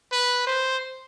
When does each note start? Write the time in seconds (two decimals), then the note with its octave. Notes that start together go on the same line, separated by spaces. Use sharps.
0.12 B4
0.47 C5